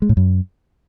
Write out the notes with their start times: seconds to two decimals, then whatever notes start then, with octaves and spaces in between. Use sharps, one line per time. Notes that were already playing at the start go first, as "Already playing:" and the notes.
0.02 G#3
0.09 A2
0.17 F#2